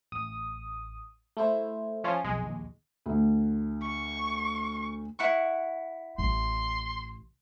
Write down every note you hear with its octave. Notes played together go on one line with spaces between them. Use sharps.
A1 D#6
A3 E4 C5
F3 C#4 F4
B1 F2 G#3
A#1 D#2
D2
C#6
E4 F#5 C#6
A1 C6